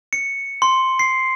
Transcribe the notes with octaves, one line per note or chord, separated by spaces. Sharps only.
C#7
C6
C7